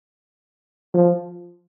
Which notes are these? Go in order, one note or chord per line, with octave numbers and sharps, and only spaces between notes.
F3